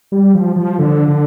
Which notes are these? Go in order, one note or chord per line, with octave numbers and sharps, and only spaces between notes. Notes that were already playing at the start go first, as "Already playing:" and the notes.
G3
F3
F3
D3
D3